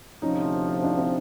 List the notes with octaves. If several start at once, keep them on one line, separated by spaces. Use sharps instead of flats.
D2 C3 F3 C#4 D#4
D4 E4
C4 D4